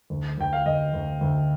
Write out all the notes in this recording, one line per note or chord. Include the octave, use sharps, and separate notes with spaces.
D2
D2 G5
F5
D2 D#5
D2
D2